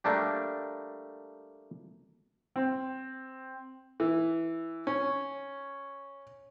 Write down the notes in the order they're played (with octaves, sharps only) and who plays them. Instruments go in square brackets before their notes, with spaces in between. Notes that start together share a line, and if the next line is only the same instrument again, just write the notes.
[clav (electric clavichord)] G3 A3 A#3 D4 G4
[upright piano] C4
[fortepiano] E3
C#4